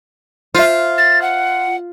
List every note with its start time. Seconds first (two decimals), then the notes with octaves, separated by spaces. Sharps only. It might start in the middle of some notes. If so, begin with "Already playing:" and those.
0.55 F4 C5 E5
0.97 A6
1.21 F#5